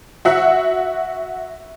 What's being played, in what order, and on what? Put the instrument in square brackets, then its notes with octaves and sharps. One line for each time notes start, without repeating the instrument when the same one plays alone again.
[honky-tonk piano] F#4 E5 F#5